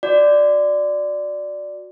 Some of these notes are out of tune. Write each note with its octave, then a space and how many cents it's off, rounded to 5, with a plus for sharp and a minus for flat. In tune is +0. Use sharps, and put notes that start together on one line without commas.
F#4 -15 D5 +0